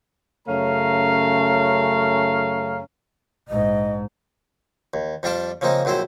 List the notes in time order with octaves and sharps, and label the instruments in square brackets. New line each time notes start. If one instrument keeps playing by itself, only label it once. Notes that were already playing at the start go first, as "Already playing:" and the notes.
[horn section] F#2 C#3 A3 C#4 F5 A#5
[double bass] A#1 G#2 [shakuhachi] D#5
[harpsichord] D#2
F2 G3 D4 F4 G5 A5
C#3 F3 A#3 C4 D#4
A#1 F#2 C4 E4 C5